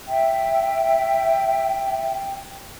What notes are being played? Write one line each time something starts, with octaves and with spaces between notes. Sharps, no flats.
E5 G5